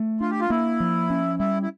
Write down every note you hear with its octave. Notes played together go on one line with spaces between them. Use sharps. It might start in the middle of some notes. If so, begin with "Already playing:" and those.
Already playing: A3
D4 F4
G4
F4
A#3 E4
F3
C#4
G3 E4
E4